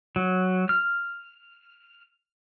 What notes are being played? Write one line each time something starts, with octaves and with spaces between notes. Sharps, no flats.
F#3
F6